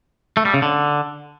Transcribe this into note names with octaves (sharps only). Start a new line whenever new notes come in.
A3
G3
C#3
D3